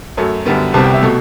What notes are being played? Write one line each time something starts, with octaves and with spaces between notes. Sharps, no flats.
F#2 F#3 A3
F#2 D3 G3 B3
C2 C3 G3 B3 A5
G5
E5
B2 A3